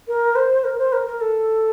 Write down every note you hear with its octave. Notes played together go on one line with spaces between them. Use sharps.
A#4
C5
A#4
C5
A#4
A#4
A4